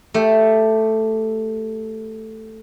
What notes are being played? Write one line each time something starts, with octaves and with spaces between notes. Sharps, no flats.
A3 G4